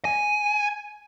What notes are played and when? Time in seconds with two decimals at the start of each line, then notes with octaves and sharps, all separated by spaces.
0.05 G#5